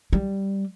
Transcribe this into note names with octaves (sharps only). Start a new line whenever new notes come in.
G3